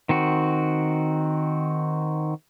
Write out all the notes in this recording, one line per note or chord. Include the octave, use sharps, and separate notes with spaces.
D#3 C4 F#4